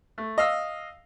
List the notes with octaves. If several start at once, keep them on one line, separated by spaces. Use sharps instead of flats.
A3
D#5 F5 E6